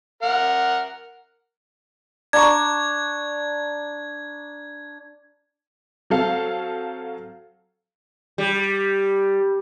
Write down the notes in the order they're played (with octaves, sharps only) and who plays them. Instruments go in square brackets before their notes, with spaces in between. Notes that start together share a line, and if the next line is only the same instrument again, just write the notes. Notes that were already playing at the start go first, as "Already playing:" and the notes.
[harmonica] A#4 F#5
[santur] D4 A#5 C#6 [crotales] G#6
[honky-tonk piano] F#3 C4 A4 F5
[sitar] G3